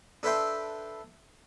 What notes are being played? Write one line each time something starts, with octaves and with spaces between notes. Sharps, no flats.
D4 A4 B4 E5 G5 C6